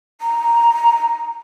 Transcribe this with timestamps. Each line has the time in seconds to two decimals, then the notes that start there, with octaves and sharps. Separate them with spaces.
0.21 A#5